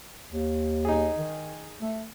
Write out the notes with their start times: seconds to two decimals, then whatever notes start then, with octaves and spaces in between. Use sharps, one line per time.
0.31 D#2
0.85 D#4 G#4
1.17 D#3
1.81 A3